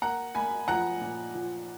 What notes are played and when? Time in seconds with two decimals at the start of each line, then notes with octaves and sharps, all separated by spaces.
0.02 A#3 F#5 A#5
0.35 A#3 G#5 B5
0.68 F3 F#5 A#5
1.01 A#2
1.34 F3